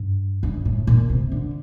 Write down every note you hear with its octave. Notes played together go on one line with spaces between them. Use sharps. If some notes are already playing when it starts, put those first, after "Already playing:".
Already playing: G2
G2
A2
A#2
C3
D3